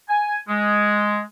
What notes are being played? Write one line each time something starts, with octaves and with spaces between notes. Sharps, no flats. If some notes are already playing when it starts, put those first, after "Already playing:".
G#5
G#3